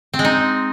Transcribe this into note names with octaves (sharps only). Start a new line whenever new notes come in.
C4
G#3
D#4